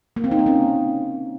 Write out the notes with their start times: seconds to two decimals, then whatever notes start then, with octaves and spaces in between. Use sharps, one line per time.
0.16 A#3
0.24 C4
0.31 D#4
0.39 A#3
0.46 C#4